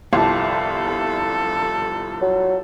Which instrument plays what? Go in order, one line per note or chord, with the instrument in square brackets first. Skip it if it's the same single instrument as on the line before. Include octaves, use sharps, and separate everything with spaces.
[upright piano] G1 C2 [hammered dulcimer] F3 G4 [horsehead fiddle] A4
[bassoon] F#3